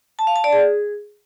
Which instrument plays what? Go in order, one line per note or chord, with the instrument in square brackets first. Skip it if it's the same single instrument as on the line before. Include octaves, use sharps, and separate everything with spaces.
[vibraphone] A5
F5
A5
D5
G#4